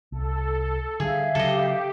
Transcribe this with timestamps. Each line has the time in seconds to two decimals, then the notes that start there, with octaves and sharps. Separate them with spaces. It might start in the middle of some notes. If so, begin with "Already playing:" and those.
0.12 C2 A4
1.00 D3 G3 G#4 E5 F5
1.35 C#3 F#3 G4 A4 D#5